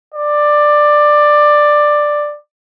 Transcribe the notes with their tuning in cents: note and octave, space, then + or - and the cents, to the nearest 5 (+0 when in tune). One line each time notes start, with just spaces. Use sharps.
D5 +10